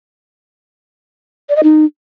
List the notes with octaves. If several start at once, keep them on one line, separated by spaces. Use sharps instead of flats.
D5
D#5
D#4